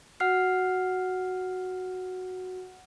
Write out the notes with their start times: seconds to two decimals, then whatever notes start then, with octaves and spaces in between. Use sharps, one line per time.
0.20 F#4 F#5 F6 C7